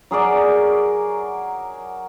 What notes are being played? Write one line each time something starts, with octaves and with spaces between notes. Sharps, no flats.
F#3 G#4 A#4 D5